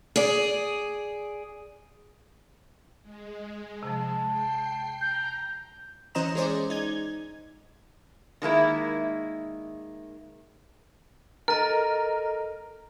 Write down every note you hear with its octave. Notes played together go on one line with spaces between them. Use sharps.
G#4 D5
G#3
C3 F3 A5
G5 C7
A#5 G6
E3 C#4 C5 D#5 A#5 E7
G#3 C#4 G#4 C5 D5
D#4 G#6
D#3 G#3 A#3 E4
A4 A#4 D#5